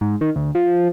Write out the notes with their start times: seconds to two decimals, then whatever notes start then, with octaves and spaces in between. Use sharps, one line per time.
0.01 G#2
0.21 D#3
0.36 D2
0.55 F3